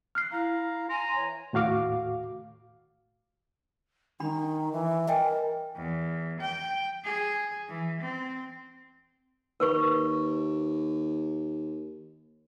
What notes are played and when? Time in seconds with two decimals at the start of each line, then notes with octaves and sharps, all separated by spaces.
0.15 F6 F#6 C7
0.32 E4 F5 A#5
0.90 G#5 A#5 C6
1.15 E3 C#5
1.53 D#2 A2 F#4 F5 D6
4.20 D#3 D4 B5
4.73 E3
5.08 A#4 D#5 G5 G#5
5.76 E2
6.41 G5
7.04 G#4
7.69 E3
8.02 C4
9.60 D#2 A#4 B4 C#6